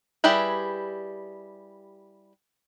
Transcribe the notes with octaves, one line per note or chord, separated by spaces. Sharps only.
G3 E4 G4 G#4 B4